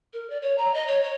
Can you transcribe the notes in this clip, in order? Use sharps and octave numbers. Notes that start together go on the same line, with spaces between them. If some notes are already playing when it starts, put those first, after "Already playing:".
A#4
D5
C#5
A#5
D#5
C#5
C#5